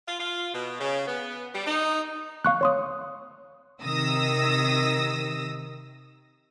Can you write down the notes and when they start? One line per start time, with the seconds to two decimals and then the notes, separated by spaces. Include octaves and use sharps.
0.08 F4
0.19 F4
0.53 B2
0.80 C#3
1.07 B3
1.54 G3
1.67 D#4
2.45 F5 C#6 F#6
2.61 C#5 C6 D#6
3.81 C3 D#3 D#6 E6 A#6